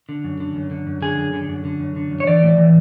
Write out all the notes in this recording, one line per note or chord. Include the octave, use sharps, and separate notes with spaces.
D3
F#2
D3
F#2
D3
F#2
D3 G#4
F#2
D3
F#2
D3
F#2
D3
F#2
C#5
E3 D5
A2
E3